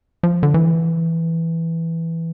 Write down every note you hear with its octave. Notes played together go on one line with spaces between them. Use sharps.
F3
D3
E3